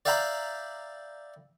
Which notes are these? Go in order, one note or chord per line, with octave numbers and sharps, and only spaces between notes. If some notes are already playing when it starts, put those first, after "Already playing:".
D5 E5 F5 G5 A#5 B5